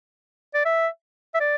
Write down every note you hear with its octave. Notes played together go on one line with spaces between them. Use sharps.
D5
E5
E5
D5